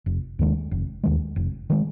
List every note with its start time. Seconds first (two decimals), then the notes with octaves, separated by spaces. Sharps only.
0.06 F1
0.39 D#2 D#3 G#3
0.71 F1
1.03 D#2 D#3 G#3
1.36 F1
1.70 D#3 G#3